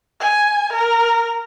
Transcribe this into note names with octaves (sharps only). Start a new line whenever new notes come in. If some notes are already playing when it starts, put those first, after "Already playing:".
G#5
A#4